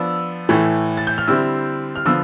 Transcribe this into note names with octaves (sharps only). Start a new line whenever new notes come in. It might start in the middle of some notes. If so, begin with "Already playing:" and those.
Already playing: F3 B3 D4 E6
A2 E3 A3
A6
G6
F6
D3 G3 C4 E4 E6
F6
D3 F3 B3 E6